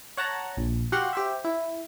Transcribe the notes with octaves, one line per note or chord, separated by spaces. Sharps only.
C#5 F#5 A5 A#5
A#1
F#4 G4 F5 F#5 C6
G4 C5 E5
E4